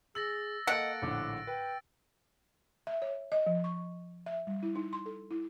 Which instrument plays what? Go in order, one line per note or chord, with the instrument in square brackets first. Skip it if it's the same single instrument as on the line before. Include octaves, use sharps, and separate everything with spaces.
[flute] G#4 [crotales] E6 A6 A#6 [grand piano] F#7
[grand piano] A#3 A4 [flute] D#5 [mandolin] F#5 [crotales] A6 D7
[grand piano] A#1 A2 D3 [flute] D6
[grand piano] B4 [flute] G5
[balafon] E5
C#5
D#5
F3
C#6
E5
G3
E4
D#4
C6
A4
E4